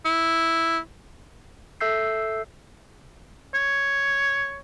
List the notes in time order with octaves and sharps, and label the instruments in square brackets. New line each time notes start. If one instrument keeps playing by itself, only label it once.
[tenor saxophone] E4
[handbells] A4 E5 E6 G6 C7
[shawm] C#5